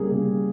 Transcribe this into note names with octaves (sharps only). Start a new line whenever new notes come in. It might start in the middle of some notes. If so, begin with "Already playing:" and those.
Already playing: C#3 G3 A#3 G#4
C#3